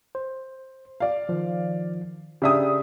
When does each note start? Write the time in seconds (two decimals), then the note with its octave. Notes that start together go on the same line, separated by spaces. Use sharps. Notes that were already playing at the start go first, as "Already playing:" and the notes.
0.15 C5
1.00 D5 F5
1.29 D#3 F3
2.42 C#3 D4 G4 E5 G5 D#6